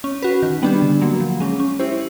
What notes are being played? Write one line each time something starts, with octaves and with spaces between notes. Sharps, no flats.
C#4
F#4 B4
D#3
G3 B3 D4 G4
D3
F#3 A#3
F3
G#3 C#4
C#4
E4 G4 C5